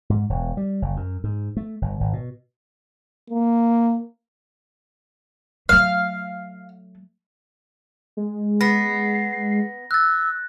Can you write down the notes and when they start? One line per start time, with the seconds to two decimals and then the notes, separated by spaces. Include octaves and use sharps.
0.10 G#2
0.30 E1
0.57 G3
0.82 F#1
0.97 F#2
1.24 G#2
1.57 A3
1.82 G1
2.00 G#1
2.13 B2
3.30 A#3
5.69 F#3 A3 F5
8.17 G#3
8.61 B3 A#6 C7
9.91 E6 F#6 A6